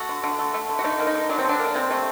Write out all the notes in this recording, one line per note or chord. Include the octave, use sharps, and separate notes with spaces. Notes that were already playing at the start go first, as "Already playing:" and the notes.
Already playing: A3 F#4
D3
D3
A3
A3
D3
F#4
D3 D#4
A#3
D#4
D3
F#3 D4
C4
D3 D4
A#3
D4
C3 C4
A3